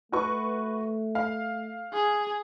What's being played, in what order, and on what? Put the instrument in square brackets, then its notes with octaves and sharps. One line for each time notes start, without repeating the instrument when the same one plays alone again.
[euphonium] A3 [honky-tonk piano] F#4 B4 C#6
[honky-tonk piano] F5
[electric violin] G#4